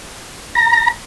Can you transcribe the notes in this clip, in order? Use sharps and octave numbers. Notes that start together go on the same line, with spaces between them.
A#5